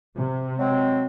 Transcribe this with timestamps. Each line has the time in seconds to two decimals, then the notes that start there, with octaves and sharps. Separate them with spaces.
0.16 C3
0.58 F#3 G#3 C4